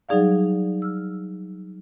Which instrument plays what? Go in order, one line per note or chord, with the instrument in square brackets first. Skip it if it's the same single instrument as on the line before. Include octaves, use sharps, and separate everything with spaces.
[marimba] F#3 G3 D#4 G#4 D5 F5
E6 F6